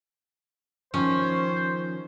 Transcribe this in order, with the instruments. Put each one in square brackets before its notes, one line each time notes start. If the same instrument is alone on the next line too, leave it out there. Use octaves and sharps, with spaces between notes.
[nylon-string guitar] D#3 F3 [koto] C#4 [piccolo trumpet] C5